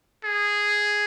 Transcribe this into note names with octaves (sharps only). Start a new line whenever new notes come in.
G#4